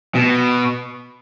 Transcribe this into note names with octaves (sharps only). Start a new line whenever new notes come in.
B2